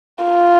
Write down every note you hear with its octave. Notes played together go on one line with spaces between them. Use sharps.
F4